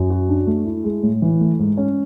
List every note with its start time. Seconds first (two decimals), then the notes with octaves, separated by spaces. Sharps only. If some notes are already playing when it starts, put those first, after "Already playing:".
Already playing: F#2
0.10 F#4
0.29 D4
0.47 A3
0.65 E4
0.84 G#3
1.03 A2
1.22 E3
1.41 A3
1.59 G#2
1.77 C#4